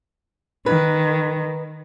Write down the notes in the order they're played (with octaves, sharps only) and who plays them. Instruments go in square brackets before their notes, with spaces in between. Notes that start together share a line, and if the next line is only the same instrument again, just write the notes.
[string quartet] D#3 [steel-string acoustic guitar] B4